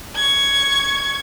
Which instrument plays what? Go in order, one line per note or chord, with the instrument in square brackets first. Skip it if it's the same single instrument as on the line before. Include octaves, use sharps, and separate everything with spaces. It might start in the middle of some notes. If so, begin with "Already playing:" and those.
[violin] C#6 G#6